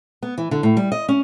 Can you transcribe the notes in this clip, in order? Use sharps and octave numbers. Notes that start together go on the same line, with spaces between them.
B3
E3
D3
A2
G3
D#5
C#4